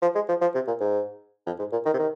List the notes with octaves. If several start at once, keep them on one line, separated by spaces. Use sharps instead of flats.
F3
G#3
F3
F3
C3
A#2
G#2
F2
G#2
A#2
D#3
C3
D#3